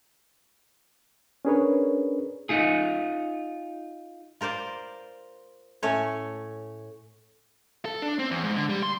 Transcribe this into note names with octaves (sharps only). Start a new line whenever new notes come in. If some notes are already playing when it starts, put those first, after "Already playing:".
C#4 D4 G#4 A#4 B4 C#5
D#4 F4 G#4
F4 A#4 C5 D5
A2 A3 C#4 C#5 G#5
A4
D4
C4
E2
G#2
D3
G3
C6